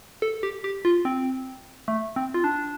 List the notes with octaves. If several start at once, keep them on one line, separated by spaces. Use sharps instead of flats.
A4
G4
G4
F4
C4
A3
C4
F4
D4